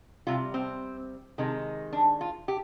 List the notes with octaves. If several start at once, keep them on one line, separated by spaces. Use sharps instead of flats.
C3 G3 F4
C4
C3 D#3 G#3
D4
F4
G4